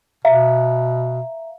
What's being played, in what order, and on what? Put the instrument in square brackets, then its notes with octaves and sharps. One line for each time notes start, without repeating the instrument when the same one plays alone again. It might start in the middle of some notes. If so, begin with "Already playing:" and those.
[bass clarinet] B2 [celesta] E5 F5 A#5